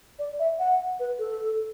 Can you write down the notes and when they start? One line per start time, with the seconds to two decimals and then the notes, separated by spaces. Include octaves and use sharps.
0.19 D5
0.39 E5
0.59 F#5
1.00 B4
1.19 A4